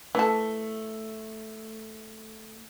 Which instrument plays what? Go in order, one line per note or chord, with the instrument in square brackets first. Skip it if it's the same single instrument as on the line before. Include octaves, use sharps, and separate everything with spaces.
[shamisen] E3 A4 [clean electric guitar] A3